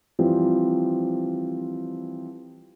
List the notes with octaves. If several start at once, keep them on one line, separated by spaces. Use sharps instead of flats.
E3 F3 G3 C4 F4